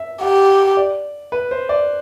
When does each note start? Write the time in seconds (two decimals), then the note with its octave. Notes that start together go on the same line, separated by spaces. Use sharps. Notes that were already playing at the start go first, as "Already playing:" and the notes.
Already playing: E5
0.21 G4 F#5
0.77 D5
1.32 B4
1.51 C5
1.69 D5